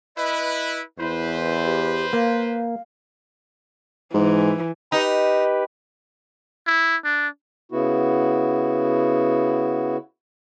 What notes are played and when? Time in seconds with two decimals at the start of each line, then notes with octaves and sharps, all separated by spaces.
0.17 E4 B4 D#5
0.99 E2 E4 B4 C5
1.65 G4
2.13 A#3 F5
4.14 G#2 E3
4.92 D#4 G4 B4
6.67 E4
7.04 D4
7.72 C#3 B3 E4 F#4